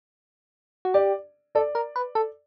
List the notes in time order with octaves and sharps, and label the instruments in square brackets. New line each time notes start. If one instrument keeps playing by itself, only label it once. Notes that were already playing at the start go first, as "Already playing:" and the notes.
[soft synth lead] F#4
[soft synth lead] G4 [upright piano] D5
[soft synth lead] A4 [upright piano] D5
[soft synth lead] A#4
B4
A4